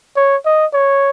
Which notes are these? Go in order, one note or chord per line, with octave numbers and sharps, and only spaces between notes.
C#5
D#5
C#5